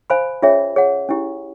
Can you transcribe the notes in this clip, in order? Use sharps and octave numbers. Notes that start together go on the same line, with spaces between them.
C5 F5 G#5 B5
C#4 F4 G#4 C#5 E5
G#4 C#5 F#5
C#4 E4 G4